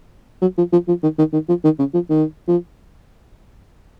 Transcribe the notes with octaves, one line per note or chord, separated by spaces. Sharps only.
F#3
F3
F3
F3
D#3
D#3
D#3
F3
D#3
C#3
F3
D#3
F3